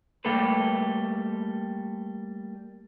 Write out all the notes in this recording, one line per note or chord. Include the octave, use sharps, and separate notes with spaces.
G3 A3 A#3 G4 A4 B4